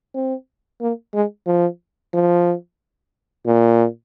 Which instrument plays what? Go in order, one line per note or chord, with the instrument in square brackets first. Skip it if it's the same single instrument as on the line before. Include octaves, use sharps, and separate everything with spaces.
[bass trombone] C4
A#3
G#3
F3
F3
A#2